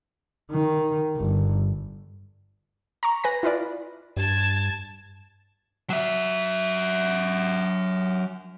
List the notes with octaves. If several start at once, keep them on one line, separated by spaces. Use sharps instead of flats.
D#3
G1
A#5 C#6
B4 G#5 A#6
E4 F4 B4 D5
G2 A5 G#6
F#3 E5